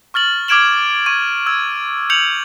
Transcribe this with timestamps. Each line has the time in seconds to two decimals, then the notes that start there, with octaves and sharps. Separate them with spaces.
0.14 C#6 F6 A6 F#7
0.48 D6 F6 G#6 D7 E7 F#7
1.06 C#6 G#6 D#7
1.46 E6 G#6
2.10 G6 C#7 F7 F#7